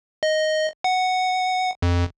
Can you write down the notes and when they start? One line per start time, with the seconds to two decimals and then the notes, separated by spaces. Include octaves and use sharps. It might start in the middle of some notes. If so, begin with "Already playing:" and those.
0.23 D#5
0.84 F#5
1.82 F2